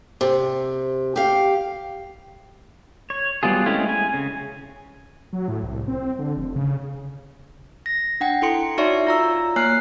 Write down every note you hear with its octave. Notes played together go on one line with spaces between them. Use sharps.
C3
G4 F5
C#5
F#3 G3 B3 F4 G#4
G#3 A3 C4 C#4 E4
G#5
C#3
F#3
A2
C2
C4
D3
F1
C#3
A#6
D4 F#5 G5
E4 A4 C6 C#7
D#4 F#4 C#5 D5 E5 C#6
F4 A#5 E6
A#3 C#5 G#5 F6 F#6 C7